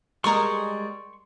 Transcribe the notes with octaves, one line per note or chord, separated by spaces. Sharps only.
G3 G#3 A#4 C6 C#6